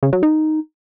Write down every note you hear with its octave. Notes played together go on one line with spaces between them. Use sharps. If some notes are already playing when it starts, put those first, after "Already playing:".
C#3
F#3
D#4